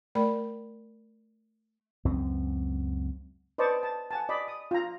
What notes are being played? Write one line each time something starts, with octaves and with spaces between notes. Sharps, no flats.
A3 A#4 D5 B5
C#2 F#2 C4
B4 C5 D5 D#5 A5 C#6
A5
F#5 G#5 A5
D5 D#5 B5
D#6
F4 A#5